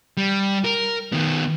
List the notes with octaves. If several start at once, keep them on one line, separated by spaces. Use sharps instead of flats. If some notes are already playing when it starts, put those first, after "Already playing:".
G3
A#4
D#3 B3